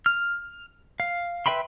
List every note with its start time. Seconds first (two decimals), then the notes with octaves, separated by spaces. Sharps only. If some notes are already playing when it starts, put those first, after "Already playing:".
0.06 F6
1.00 F5
1.46 B4 E5 G5 B5 C6